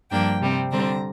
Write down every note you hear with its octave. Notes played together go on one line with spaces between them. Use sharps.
G2 F3 A#3 D4 G5
C3 G3 C4
D3 G3 C4 A#5